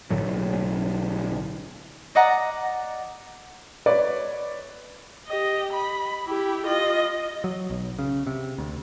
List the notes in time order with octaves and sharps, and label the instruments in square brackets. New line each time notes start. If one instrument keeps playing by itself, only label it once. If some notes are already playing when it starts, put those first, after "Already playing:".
[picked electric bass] B1 A2 D3 F#3
[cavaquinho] D5 D#5 F#5 A#5
[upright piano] B4 C#5 D5 D6
[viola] G4 D#5
B5
E4 G4
F4 D#5
[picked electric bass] F#3
B1
C#3
C3
D2